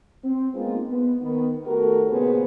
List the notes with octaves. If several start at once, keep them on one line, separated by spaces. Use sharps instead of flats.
C4
G#3 A#3 B3 D#4 F4
B3
D#3 B3
D#3 A3 F#4 G4 A4 A#4
F2 A#2 C#3 B3 G#4 C5